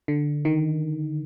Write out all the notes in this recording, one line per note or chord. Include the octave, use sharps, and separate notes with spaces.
D3
D#3